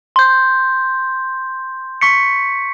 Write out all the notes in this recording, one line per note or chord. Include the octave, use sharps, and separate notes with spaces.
C6 G6
C#6 B6 C#7